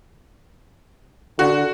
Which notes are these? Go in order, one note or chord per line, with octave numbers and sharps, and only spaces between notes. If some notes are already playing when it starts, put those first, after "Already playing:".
D3 F#4